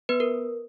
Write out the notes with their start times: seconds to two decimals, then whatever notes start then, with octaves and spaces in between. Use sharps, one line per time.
0.09 B3 B4
0.20 A#4